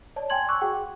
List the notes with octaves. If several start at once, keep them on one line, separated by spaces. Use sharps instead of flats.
C#5 D5 A5
G5 G#5 C6 G#6 F#7
C#6 D6 E6 F#6
F#4 G#4 F#5 G5